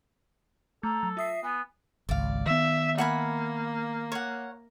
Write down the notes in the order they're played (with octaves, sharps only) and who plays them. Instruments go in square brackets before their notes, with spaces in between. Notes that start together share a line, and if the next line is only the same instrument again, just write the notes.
[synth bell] A3 [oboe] A4 [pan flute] A#5
[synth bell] F#3
[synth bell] F4 D#6 C7 [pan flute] E5
[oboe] B3 [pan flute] G#5
[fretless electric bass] G#1 C#2 [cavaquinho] D5 F5
[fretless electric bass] D#3 B3 [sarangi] E5
[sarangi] A#3 [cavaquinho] F#5 G#5 B5
[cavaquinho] C#5 F#5